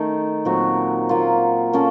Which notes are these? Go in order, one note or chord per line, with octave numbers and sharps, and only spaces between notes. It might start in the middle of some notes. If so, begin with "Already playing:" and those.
Already playing: D#3 A3 D#4
A#2 F#3 C4 F#4
F#3 A#3 F4
A#3 C#4 A4